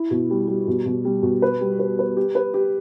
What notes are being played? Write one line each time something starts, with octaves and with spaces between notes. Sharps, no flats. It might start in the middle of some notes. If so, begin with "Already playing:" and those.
Already playing: E4
B2
G3
G3
B2
B2
G3
B2
B4
G3
B4
B4
G4
B4
G4